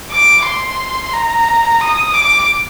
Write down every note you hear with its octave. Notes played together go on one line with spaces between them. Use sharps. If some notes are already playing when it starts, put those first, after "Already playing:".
D6
C6
A#5
D#6
D6